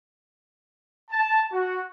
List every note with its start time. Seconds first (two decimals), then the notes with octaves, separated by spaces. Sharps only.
1.11 A5
1.52 F#4